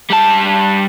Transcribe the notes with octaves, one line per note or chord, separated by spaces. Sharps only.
G3 A5